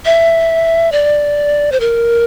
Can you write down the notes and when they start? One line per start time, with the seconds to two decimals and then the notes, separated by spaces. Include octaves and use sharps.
0.05 E5
0.92 D5
1.72 C5
1.80 A#4